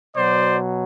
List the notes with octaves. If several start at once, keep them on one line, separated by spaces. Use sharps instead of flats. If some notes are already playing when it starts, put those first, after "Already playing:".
B2 F#3 C5 D5